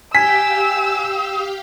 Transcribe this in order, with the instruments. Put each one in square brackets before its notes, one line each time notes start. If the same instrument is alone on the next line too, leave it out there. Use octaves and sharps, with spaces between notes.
[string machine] G4 F5 G5 [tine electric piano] G#5 [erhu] E6 [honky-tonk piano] B6